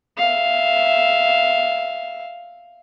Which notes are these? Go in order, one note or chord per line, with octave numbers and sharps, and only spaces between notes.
E5 F5